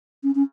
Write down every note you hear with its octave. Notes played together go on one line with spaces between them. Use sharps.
C#4
C#4